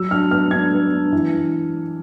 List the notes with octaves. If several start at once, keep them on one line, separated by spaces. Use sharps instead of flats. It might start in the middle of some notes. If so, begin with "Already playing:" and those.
Already playing: F#3 E6
D4 F6
B3 F6
D4 G#6
B3
D4
E3